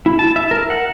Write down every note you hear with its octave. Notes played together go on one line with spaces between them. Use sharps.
E4
A5
E5
A#4
F#5